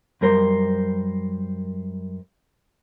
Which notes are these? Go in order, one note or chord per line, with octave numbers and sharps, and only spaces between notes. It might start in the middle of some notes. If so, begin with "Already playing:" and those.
F#2 G3 A#4 C5